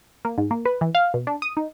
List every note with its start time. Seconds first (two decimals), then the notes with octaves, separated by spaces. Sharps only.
0.25 A#3
0.38 G#2
0.51 A#3
0.65 B4
0.81 E3
0.95 F5
1.14 B2
1.27 D4
1.42 D#6
1.57 D#4